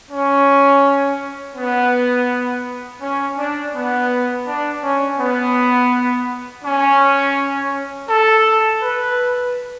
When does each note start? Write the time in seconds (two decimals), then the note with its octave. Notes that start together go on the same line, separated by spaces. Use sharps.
0.11 C#4
1.56 B3
3.01 C#4
3.37 D4
3.74 B3
4.46 D4
4.82 C#4
5.18 B3
6.63 C#4
8.08 A4
8.81 B4